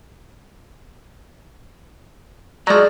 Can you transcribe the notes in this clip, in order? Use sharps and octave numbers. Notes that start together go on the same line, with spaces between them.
F3 F#3 G#3 D5 A#5